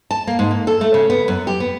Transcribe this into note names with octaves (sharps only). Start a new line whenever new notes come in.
A5
A#3
G#2
A#3
A4
A3
C#3
B3
F#2
G4
B3